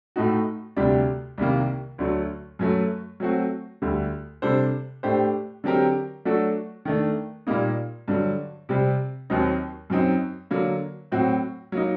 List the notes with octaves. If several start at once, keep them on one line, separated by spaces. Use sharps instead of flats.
A2 A3 D#4 F#4
D2 C3 G3 D4 G4
C2 C3 D#3 G3 A#3
D2 D3 F#3 A3
F#2 F#3 A3
F#3 A3 C4 F#4
D2 D3 G3
C3 G3 D4 A4 C5
A2 A3 D4 G4 C5
D3 F#3 C4 G4 A#4
F#3 A3 D4 F#4 A4
D#3 A3 D4
A#2 G3 A#3 D#4
G2 D3 F#3
C3 G3 C4
D#2 D#3 F#3 C4 D#4
F#2 F#3 C4 D#4
D3 F#3 A#3
A2 F#3 C4 F#4
F#3 A#3 D#4